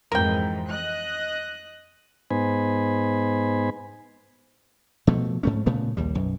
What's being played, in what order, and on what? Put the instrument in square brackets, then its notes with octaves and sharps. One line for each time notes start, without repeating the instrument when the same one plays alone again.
[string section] F2 G#2 E3 [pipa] A#4 G5
[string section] D#5 F#6
[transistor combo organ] G#2 B3 D#4 C5 G#5 B5
[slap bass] B2 F3 A3
G#2 A3 C#4
A#2 C#3 A3 B3
A#1 D#2 G3
B1 F#2